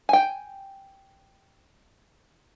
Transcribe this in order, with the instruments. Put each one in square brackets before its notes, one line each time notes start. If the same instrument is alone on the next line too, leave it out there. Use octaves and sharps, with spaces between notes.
[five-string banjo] G5 G#5